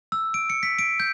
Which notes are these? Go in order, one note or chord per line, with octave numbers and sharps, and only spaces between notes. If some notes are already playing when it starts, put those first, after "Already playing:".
E6
D7
C#7
B6
D7
G6